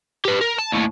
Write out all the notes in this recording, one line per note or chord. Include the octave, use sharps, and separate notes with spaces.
G4 B4
A#4
A5
D#2 A2